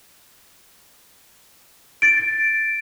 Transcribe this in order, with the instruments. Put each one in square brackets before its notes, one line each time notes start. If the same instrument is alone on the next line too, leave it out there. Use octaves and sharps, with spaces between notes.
[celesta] A6 D7